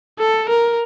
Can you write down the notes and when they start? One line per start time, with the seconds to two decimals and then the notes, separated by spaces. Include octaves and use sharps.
0.19 A4
0.49 A#4